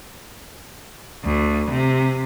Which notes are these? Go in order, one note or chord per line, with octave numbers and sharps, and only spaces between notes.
D2
C3